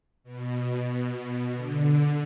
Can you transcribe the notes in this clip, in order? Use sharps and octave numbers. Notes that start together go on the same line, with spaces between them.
B2
D3